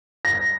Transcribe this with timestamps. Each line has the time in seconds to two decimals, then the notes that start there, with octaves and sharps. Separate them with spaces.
0.25 A#6